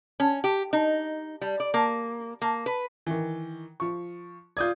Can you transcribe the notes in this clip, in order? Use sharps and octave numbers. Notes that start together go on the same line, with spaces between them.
C#4
G4
D#4
G3
D5
A#3
A#3
B4
D#3 E3
F3 C#6
F4 D5 D#6 G6 G#6